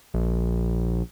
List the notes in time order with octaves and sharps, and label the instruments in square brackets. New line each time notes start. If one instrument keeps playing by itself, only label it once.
[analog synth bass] A#1